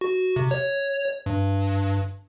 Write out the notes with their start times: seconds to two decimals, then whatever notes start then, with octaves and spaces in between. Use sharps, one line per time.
0.01 F#4
0.36 C3
0.51 C#5
1.26 G2